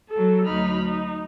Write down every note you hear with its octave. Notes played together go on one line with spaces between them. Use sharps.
F#3 A4
D2 F#3 D#4 B5 F6
D#4